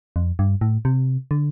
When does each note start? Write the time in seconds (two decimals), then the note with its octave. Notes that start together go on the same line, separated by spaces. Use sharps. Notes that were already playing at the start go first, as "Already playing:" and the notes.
0.16 F2
0.39 G2
0.61 A2
0.85 C3
1.31 D3